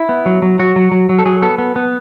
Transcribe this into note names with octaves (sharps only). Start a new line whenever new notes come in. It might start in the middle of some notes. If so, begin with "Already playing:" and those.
Already playing: E4
B3
F#3
F#3
F#3 F#4
F#3
F#3
F#3
A4
F#3 G#4
B3 A4
B3
B3